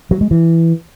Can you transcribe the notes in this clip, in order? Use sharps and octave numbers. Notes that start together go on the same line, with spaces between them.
F#3
G#3
E3